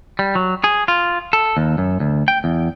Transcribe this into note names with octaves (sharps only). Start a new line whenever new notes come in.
G3
F#3
G#4
F4
A4
D#2
F#2
D2
G5
E2